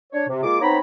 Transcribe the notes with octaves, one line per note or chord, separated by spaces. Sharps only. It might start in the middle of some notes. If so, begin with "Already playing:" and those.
D4 C#5
C3
G#3 A#3 F4 D6
B3 C4 D#4 C#5 A#5 B5